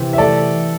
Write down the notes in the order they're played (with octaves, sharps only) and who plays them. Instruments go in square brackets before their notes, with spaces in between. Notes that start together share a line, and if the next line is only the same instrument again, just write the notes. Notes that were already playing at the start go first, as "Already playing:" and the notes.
Already playing: [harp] C3 E3 C4 G4
[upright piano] E5
[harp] A3 [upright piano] A4 D5